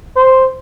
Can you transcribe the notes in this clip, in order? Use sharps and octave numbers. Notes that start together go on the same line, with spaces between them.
C5